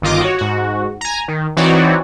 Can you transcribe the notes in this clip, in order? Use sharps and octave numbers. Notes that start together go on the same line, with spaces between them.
G1 D#3 F4 D#5 D6
F#4 C#5
G#2 F#4
G#5 A#5
D#3
E3 C4 D#4 F#4 C#5 D5